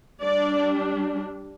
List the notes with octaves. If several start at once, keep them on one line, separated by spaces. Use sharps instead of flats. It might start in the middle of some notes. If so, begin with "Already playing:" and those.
G3 D4 D5